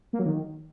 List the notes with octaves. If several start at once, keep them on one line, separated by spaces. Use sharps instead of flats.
A#3
F#3
D#3